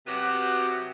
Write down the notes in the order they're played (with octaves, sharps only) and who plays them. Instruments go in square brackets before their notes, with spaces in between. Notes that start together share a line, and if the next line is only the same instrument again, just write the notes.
[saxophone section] C3 F#3 B3 F#4 G4